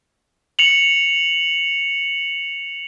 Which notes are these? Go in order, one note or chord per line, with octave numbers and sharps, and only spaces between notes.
C#7 F7 F#7